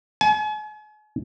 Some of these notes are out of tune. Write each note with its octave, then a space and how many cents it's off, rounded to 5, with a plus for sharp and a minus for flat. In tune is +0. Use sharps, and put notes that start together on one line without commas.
G#5 +40